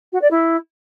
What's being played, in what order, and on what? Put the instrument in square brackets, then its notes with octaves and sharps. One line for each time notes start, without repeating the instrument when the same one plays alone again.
[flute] F#4
D5
E4